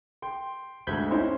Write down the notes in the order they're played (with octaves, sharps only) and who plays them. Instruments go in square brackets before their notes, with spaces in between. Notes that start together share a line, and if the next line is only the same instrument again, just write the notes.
[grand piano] G5 C6
[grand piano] D2 G#2 D3 [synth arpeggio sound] B5 G6 G#6
[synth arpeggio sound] C4 D#4 E4 [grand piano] C#4 C5